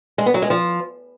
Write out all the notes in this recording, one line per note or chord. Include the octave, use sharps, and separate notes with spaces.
G#3
B3
F#3
G#3
F3